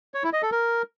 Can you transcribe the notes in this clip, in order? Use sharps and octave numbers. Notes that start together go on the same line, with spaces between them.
C#5
E4
D#5
A4
A#4